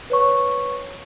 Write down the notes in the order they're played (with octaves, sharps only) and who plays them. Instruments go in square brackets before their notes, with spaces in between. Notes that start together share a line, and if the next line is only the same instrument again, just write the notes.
[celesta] B4 C#5 C#6